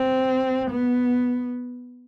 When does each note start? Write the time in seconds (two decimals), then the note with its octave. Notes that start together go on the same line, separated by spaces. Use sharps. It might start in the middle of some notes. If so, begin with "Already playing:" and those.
Already playing: C4
0.70 B3